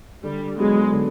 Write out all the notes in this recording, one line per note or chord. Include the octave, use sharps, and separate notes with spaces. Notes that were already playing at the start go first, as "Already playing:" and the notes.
D3 G3
F#3 G#3 B3
D3